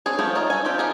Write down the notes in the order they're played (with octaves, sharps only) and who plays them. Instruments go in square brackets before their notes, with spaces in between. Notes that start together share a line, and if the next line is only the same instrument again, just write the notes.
[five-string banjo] C4 D4 G#4 C#5
F3 A3 B3 C4
D#4 F4 C#5
A4 G#5
C4 F4 G4
F3 D#4 G#4 E5